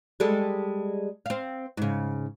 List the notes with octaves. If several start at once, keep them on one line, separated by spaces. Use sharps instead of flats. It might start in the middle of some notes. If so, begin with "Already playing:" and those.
G3 G#3 A4
C4 F5
G#2 C#3